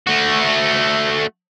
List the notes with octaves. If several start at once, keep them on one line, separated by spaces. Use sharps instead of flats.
A3 F#4